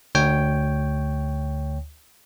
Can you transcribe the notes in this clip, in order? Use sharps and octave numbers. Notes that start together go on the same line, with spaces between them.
D2 C#5 G5